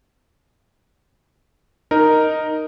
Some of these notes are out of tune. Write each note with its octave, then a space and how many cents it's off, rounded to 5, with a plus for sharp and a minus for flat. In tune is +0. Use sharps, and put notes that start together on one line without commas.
D#4 +0 A#4 +0